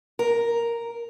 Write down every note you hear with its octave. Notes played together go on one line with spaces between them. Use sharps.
A#4